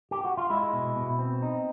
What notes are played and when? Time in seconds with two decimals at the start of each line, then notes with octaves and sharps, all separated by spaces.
0.11 G4
0.25 F#4
0.37 F4
0.50 G#3 E4
0.73 B2
0.96 B2
1.19 C4
1.42 D#4